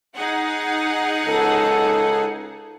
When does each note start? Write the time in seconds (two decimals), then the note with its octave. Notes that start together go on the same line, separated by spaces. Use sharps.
0.15 D#4 G#4 F#5
1.26 C#2 A4